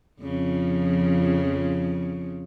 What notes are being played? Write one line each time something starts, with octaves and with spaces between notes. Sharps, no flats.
F2 C#3 F3